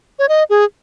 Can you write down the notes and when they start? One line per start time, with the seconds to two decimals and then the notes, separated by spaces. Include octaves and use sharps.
0.19 C#5
0.29 D#5
0.50 G#4